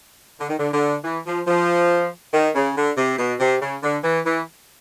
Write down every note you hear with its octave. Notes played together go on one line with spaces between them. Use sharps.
D3
D#3
D3
D3
E3
F3
F3
D#3
C#3
D3
C3
B2
C3
C#3
D3
E3
E3